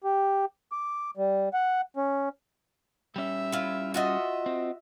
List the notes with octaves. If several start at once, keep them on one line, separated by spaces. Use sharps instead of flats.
G4
D6
G3
F#5
C#4
G3 C#4 E5
E4 F4
F4 F#4 D#5 E5
C4